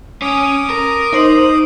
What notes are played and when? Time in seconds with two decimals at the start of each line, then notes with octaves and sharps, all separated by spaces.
0.22 C#4 D6 D#6
0.70 A#4
1.13 D#4 C5 F#7